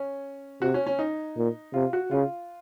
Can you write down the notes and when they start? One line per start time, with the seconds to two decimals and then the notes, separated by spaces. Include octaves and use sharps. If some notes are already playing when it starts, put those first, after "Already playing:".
Already playing: C#4
0.62 C3 F#4
0.74 C#4
0.87 C#4
0.99 D#4
1.37 A#2
1.74 C3 F4
1.93 F#4
2.11 C#3 F4